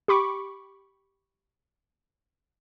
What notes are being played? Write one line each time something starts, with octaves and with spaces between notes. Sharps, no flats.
G4 B5 C#6 D6